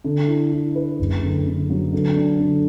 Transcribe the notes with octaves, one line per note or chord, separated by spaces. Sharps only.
D3
E4
E4
B4
F#1
D3
D3
F#3
D3
D4
D3